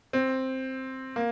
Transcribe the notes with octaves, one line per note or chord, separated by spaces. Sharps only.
C4
A#3